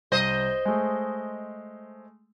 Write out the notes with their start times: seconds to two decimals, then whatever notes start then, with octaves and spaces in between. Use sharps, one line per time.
0.12 C2 C5 D#5
0.65 G#3 A3